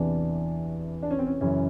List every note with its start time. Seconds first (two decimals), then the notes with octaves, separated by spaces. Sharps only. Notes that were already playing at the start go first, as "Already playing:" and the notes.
Already playing: E2 C3 E3 D4
1.03 D4
1.11 C#4
1.19 C4
1.27 C#4
1.41 F#2 C#3 E3 C#4